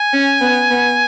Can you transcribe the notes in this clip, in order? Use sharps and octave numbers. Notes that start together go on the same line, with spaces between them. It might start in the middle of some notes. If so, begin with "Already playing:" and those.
Already playing: G#5
C#4
B3
B3